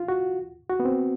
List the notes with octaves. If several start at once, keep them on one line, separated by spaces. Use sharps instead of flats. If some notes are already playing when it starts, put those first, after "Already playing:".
Already playing: F4
F#4
F#4
B3
C4